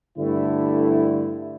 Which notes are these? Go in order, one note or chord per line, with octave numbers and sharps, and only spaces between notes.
G2 D3 A3 E4